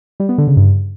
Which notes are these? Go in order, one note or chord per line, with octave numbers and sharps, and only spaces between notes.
G3
B3
D3
C#3
G2